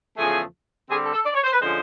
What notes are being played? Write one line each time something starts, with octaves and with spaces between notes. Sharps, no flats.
E2 C#3 F3 A3 G#4
D3 G3 C4 G#4
A4
A4
D5
C#5
C5
B4
D3 F3 G#3 C#4 C5